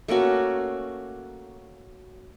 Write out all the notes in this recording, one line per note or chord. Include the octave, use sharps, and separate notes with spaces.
A3 A#3 C#4 F#4